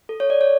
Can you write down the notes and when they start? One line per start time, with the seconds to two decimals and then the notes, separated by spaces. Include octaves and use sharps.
0.09 A4
0.20 C#5
0.30 A4 D5
0.41 C#5